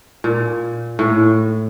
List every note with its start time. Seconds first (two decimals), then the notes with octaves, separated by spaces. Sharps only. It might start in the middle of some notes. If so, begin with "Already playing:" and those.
0.24 A#2
0.99 A2